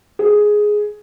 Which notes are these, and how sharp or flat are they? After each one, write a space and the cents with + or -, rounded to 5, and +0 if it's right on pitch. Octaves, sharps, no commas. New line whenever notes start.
G#4 +5